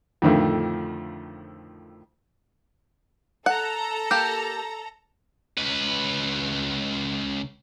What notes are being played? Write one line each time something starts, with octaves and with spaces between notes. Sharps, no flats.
F2 A2 D3 D#3 F3 A3
A4 F#5 A#5
A#3 G4
C#2 B4